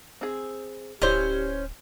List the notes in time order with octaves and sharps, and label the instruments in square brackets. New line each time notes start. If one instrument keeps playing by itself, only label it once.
[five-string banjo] C4 G#4
[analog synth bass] D1 [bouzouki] C#4 C5 [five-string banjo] E4 D5 [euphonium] G4